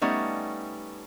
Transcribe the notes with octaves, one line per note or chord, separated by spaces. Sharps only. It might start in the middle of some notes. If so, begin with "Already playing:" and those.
G3 A3 B3 C#4 D#4